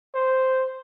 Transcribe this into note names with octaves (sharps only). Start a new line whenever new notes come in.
C5